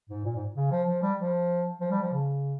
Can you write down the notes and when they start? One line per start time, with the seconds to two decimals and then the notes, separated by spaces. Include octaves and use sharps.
0.09 G#2
0.25 A#2
0.35 G#2
0.56 C#3
0.71 F3
0.87 F3
1.02 G3
1.19 F3
1.81 F3
1.91 G3
2.01 F3
2.12 C#3